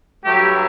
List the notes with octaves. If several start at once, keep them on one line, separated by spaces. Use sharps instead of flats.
G2 F#3 A3 G4